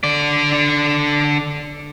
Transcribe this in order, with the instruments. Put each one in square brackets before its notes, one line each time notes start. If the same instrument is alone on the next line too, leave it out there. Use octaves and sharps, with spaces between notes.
[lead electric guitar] D3 D5